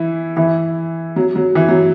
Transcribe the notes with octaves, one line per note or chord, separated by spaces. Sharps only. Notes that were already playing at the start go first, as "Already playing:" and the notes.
Already playing: E3 E4
E3 E4
F#3
F#3
E3
F#3